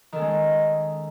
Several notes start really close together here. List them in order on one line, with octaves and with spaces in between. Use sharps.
D#3 A4 C#4 G#3